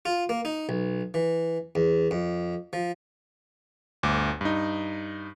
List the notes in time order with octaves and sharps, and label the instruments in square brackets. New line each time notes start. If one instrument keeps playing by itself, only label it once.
[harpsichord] F4
A#3
D#4
B1
E3
E2
F2
F3
[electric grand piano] G1 D2 D6
G2 D#4